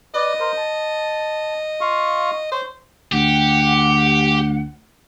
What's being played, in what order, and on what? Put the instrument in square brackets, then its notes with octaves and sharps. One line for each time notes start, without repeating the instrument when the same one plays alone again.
[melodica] B4 D5 [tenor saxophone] D#5
[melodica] A#4 C5
A5
F4 F5 C#6
[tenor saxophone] C5 [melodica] C#5
[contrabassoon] D2 [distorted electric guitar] G4 [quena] F#5